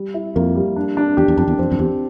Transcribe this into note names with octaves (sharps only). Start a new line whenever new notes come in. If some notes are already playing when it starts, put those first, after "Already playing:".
Already playing: G3
E4
F2 A#3
G3
D4
D4
E2 G4
E2
F2 D4
E2
F2 C4
F2
E2 G4